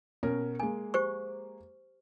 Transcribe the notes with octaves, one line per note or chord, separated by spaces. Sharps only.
B2 C#4 A#4
G#3 A#3 G#5
G4 C5 C#6